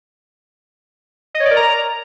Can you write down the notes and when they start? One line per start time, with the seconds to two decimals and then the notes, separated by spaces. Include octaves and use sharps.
1.35 D#5
1.40 C#5
1.45 D5
1.51 A#4
1.56 A#5